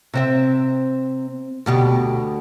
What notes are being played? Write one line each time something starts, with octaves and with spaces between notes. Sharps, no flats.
C3 C4 E5
D2 B2 G4